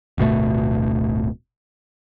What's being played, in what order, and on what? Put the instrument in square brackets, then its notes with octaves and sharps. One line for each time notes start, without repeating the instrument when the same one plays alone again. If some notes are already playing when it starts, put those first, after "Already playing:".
[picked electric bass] D1 G1 B2 A3